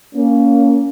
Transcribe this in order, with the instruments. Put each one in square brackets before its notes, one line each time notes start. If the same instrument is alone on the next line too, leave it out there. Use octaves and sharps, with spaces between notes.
[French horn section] A#3 C#4